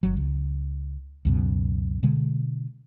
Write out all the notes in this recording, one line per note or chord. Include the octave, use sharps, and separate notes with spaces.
G1 F#3
C#2
C#2 F#2 B2
B2 D3 G#3